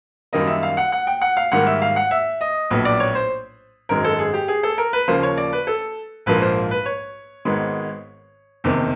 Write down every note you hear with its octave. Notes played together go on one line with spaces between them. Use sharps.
F#2 D#3 G3 A#3 D#5
E5
F5
F#5
F#5
G5
F#5
F5
G#2 D#3 G3 A#3 F#5
E5
F5
F#5
E5
D#5
A#1 A2 F#3 B3
D5
C#5
C5
G#1 F#2 D#3 G#3 A#4
A4
G#4
G4
G#4
A4
A#4
B4
D#2 C#3 F3 A#3 C5
C#5
D5
B4
A4
A#1 G#2 F3 A#3 B4
C5
B4
C#5
G#1 G#2 D#3 G#3 B3
F#1 E2 C3 D#3